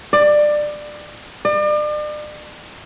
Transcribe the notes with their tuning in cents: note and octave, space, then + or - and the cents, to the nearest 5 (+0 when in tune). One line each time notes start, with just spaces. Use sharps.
D5 +20
D5 +40